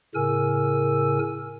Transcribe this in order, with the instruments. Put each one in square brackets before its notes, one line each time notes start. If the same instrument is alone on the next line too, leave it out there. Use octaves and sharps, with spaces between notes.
[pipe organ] A2 C#3 A#4 G#5 E6